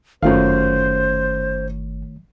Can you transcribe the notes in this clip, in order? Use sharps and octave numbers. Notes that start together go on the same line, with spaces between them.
G1 F#2 D#3 A3 F4 C5 C#5 F5